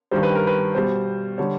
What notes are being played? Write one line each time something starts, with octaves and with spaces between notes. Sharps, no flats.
G2 D#3 G3 C5
B4
A#4
B4
B2 G3 C5
D3 G3 C#5